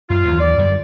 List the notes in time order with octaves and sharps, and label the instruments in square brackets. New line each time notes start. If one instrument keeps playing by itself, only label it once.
[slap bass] F#2 [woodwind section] F4
[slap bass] D#2 E3 F#3
[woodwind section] D5
[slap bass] F#2 D3 G3